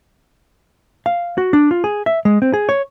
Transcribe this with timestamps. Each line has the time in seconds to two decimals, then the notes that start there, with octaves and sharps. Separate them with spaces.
1.06 F5
1.38 F#4
1.53 D4
1.71 F4
1.84 G#4
2.06 E5
2.25 G#3
2.42 C4
2.54 G#4
2.69 C#5